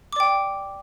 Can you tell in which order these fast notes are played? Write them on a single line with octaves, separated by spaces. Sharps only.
D6 D5 G5